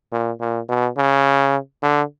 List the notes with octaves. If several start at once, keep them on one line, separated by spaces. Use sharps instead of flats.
A#2
A#2
B2
C#3
D3